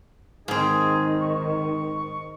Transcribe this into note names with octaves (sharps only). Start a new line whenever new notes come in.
G#2 D#3 C4 D#4 G#4
C#6